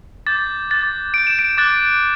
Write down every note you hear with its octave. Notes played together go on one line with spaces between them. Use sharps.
D6 G6 A6
D6 F#6 A6
D6 G6 D7
E7
D7
D6 F#6 A6